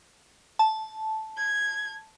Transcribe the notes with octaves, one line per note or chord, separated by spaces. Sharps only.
A5
G#6